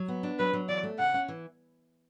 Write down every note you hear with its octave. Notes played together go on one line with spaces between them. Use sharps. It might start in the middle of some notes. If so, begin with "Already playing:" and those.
Already playing: F#3
B3
D4
F#3 B4
F#3
E3 D5
A3
C#3 F#5
C#4
E3